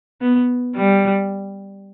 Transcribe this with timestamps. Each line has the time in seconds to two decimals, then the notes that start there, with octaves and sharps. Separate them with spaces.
0.21 B3
0.76 G3